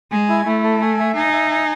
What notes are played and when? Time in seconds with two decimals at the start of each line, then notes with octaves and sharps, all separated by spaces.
0.11 G#3 G#5
0.29 E4
0.46 A3 E4
0.63 A4
0.81 G#5
0.99 E5
1.16 D#4 G#5
1.33 E5
1.51 G#5